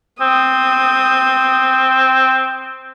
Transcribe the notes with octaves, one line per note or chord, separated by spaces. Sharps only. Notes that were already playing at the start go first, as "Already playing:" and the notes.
C4 D#6